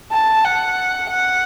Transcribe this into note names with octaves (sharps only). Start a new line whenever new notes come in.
A5
F#5
F#5